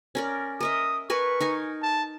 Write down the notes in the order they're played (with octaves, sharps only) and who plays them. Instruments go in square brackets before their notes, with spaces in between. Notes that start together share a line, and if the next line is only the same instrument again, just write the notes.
[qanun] C#4 A#4 D5
[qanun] A#4 D#5 E5 [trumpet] D#6
[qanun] A#4 B4 G#5 [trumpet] C#6
[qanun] D#4 A#4 G#5
[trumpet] A5